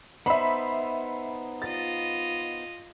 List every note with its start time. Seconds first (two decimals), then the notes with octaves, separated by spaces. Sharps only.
0.26 B3 D#4 C5 E5 B5
1.62 F4 D#5 A6